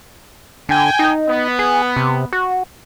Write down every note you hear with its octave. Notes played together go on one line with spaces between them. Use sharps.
D3 G5 G#5
D#4
B3
G#4
C3
F#4